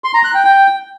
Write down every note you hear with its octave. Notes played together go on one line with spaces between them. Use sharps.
C6
A#5
F#6
G5
G5